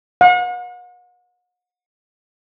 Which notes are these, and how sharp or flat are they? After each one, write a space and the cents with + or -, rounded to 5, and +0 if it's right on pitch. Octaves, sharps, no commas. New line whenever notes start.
F#5 -40